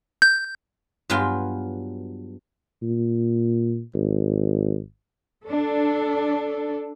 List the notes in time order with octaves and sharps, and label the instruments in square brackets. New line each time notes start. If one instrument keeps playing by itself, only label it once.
[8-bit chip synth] G6
[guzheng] G2 F#3 B3 F4 G5 G#5
[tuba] A#2
G#1
[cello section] D4 A4